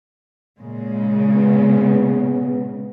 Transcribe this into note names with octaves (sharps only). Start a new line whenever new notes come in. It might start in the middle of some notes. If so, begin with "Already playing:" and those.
A#2 C#3 G#3
B3